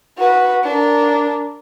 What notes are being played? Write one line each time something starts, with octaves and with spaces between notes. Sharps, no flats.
F#4 B4
D4 A#4